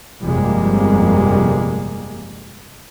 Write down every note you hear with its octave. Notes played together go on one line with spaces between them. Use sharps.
G1 F2 C3 G3 G#3 A#3